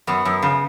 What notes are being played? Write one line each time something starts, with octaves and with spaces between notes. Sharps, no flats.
F#2 B3
F#2
C#3